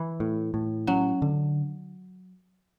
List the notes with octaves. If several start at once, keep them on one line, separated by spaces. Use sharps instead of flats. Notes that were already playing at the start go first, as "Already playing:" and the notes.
Already playing: E3
A2
A2
F#3 C#4
D3